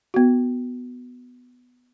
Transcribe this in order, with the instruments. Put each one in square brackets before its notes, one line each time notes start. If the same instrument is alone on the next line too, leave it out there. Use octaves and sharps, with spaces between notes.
[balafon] B3 F#4